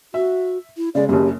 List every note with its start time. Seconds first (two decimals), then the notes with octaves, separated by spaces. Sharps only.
0.14 F#4 E5
0.77 E4
0.95 C#3 G#3 D5
1.09 F#1 F#2 G4